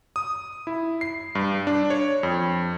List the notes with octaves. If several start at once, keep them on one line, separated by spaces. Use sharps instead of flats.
D#6
E4
C7
G2
D4
C#5
F2